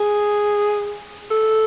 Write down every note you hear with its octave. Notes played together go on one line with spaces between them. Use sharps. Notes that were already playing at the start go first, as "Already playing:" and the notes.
Already playing: G#4
A4